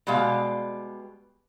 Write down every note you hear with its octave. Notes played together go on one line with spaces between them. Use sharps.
B2 G3 G#3 F5